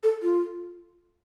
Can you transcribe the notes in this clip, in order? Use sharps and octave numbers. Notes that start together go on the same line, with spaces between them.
A4
F4